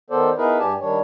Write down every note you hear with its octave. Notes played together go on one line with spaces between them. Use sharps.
D#3 B3 A4 C5 D5
B3 D#4 E4 G#4 A#4 B4
G2 G4 D5 G#5 A5
D#3 G3 D4 C#5